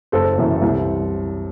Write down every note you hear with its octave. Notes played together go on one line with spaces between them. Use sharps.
F#1 A4 C5
F#2 E3
C2